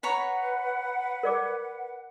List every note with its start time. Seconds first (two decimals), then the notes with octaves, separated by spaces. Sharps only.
0.03 B4 C#5 F#5 A#5 B5
1.23 A#4 D5 D6